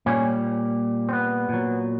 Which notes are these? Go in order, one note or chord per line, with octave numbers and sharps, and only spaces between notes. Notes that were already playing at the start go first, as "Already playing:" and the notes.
A#2 G3 C#4
C4
B3
A#2 F#3